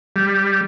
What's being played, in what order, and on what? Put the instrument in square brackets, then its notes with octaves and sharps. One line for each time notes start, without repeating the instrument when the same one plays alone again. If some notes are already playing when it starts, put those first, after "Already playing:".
[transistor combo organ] G3